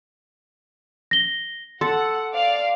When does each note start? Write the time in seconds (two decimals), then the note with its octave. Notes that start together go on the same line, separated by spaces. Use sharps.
1.11 A#6 G7
1.81 A4 F#5 C6
2.33 D5 F5